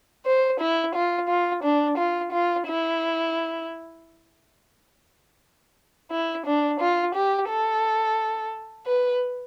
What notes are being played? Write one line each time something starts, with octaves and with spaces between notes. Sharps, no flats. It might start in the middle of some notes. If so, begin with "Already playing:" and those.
C5
E4
F4
F4
D4
F4
F4
E4
E4
D4
F4
G4
A4
B4